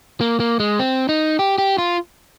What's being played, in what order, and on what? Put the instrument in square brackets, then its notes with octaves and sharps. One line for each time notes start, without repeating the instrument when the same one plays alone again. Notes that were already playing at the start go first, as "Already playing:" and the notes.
[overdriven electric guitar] A#3
A#3
G#3
C4
D#4
G4
G4
F4